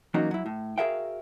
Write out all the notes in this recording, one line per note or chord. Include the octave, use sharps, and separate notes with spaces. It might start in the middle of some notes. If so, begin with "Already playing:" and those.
E3 F#3 A#3 C#4 D#4 F#4
F#3 E4
A2
F#4 G#4 A#4 E5 F5 G5